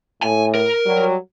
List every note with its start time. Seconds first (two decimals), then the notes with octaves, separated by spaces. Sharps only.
0.23 A2 G#5
0.55 A#4
0.86 F#3 G3